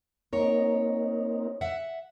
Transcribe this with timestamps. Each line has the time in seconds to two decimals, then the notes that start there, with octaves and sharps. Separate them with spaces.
0.33 A#3 C4 D#4 A#4 C#5
1.61 E5 F#5